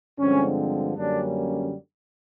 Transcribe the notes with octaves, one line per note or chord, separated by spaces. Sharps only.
G2 D3 F3 G#3 C4 C#4
F#2 D3 G3 A#3 C#4 D4